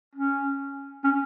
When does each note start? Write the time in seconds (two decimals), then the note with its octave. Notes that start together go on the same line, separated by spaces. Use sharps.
0.15 C#4
1.04 C#4